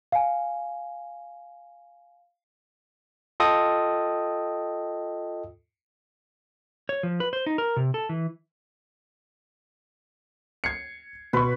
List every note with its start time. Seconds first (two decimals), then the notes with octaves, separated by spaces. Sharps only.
0.12 F5 G#5
3.40 F4 A4 D#5 G5 D#6
6.89 C#5
7.03 F3
7.20 B4
7.33 C5
7.46 D#4
7.58 A#4
7.77 C3
7.94 A4
8.09 E3
10.64 G#6 C7 C#7
11.33 B2 B4 C6 C#6